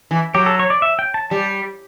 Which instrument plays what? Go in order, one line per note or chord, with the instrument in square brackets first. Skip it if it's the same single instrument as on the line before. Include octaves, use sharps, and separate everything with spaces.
[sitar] E3
[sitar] F#3 [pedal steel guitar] G4
[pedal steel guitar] A4
C#5
D5
E5
G5
A5
[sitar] G3 [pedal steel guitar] A5